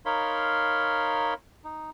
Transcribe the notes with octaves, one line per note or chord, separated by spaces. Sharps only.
D#4 A#4 C#5 F5 B5 C6
D#4